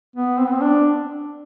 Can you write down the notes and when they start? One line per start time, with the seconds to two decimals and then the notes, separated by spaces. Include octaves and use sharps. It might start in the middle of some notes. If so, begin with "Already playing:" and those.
0.16 B3
0.39 C4
0.46 B3
0.54 C4
0.61 D4